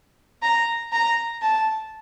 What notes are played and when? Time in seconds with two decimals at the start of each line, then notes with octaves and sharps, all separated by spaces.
0.43 A#5
0.93 A#5
1.42 A5